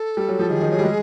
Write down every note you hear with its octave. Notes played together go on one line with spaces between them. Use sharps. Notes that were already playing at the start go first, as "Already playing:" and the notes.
Already playing: A4
G3
F#3
F3
D#3 G#4
D#3
F#3
G3
G#3